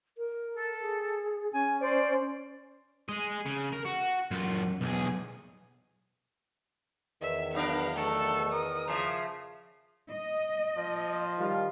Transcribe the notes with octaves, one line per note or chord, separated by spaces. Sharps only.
A#4
A4
G#4
C#4 G#5
C5 D5
G#4 D#5
C#3
A#4
F#4
F#2 F4
B1 G#4
E2 D#3 E5
F#3 B3 D4 A#4 F5
A3 A4
A#4 D#6
C#3 F3 E5
D#5
F3
D#3 G3 F4